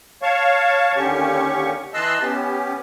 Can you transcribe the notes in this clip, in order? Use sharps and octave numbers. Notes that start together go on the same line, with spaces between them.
C#5 F5 A5 C#6
D#2 D3 C#4 G4 C#6
E3 D#5 A5 C6 E6 F#6
B3 C#4 G4